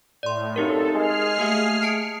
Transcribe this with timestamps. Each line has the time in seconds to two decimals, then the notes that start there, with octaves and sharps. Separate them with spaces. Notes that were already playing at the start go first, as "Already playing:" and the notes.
0.23 A2 D5 C6
0.56 F#2 C4 D#4 G4 A4 A#4
0.95 G#3 G#4 F6 C7
1.38 A3 A#3 G4 F5
1.83 A5 C#7 D7